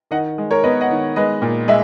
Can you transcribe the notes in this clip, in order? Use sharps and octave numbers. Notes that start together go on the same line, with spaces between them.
D#3 D#5 F#5
G#3
A#4 C#5
B3 B4 D#5
D#5 F#5
D#3
G#3 B4 D#5
A#2
G#3 E5